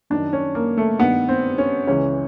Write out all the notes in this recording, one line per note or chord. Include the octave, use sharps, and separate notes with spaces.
F#2 D#3 D4
C#4
A#3
A3
G2 D#3 B3
C4
C#4
C#2 C#3 E3 C#4